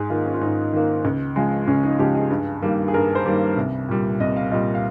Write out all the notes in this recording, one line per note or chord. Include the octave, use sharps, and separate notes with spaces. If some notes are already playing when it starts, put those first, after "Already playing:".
Already playing: G#2 G#4
D#3 A#3 F4
C#4
F4
G#2 D#4
D#3 A#3
C#2
C#3 F3 G#3
C#2 C#4
D#4
C#3 F3 G#3 G4
G#4
G2
D#3 G3 A#3
G#4
G2 A#4
C5
D#3 G3 A#3
C2
A#2 G3
C2 D#5
F5
A#2 G3 D#5
F5